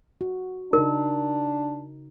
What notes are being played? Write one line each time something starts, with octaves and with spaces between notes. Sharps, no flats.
F#4
C#3 D4 D#4 A#4